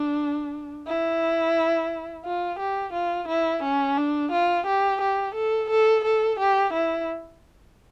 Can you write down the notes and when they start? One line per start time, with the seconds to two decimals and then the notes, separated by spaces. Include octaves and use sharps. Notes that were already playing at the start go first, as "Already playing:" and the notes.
Already playing: D4
0.86 E4
2.24 F4
2.59 G4
2.93 F4
3.28 E4
3.63 C#4
3.97 D4
4.32 F4
4.66 G4
5.01 G4
5.35 A4
5.70 A4
6.04 A4
6.40 G4
6.73 E4